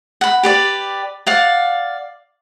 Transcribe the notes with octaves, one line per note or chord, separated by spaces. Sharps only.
F#5 B5
G4 B4 D5
D5 F5 F#5